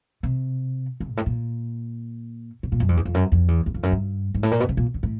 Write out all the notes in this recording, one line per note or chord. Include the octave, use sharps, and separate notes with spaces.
C3
D3
G#2
A2
A#2
B2
A#2
F#2
F2
E2
F2
F#2
F2
E2
E2
F2
F#2
G2
G#2
A2
A#2
B2
C#3
A#2
D3
A2